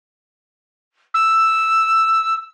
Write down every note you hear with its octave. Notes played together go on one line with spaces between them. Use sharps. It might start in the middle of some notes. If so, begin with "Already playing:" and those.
E6